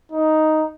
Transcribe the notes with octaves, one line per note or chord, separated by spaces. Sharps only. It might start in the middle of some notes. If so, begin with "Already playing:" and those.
D#4